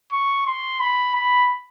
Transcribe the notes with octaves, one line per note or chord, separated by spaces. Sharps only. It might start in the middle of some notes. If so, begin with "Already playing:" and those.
C#6
C6
B5
B5